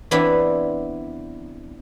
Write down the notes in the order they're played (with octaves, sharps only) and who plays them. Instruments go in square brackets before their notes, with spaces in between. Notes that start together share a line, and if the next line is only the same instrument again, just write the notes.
[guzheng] E3 B3 C4 D4 E4 B5